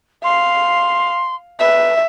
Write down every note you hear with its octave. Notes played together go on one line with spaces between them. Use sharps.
F5 C6
B4 E5